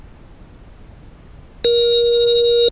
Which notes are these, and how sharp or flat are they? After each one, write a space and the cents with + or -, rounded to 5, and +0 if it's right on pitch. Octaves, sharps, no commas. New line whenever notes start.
A#4 +25